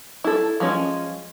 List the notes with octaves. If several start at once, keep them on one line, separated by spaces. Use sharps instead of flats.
E4 A4
F3 G#3 C#4